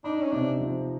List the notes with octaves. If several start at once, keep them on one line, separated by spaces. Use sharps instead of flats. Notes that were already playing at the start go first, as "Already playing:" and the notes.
D4 D#4
C#4
C3 D4
F3